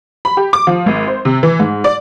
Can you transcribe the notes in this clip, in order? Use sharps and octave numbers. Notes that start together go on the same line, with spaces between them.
B5
G4
D6
F3
G#1
C5
C3
E3
G#2
D5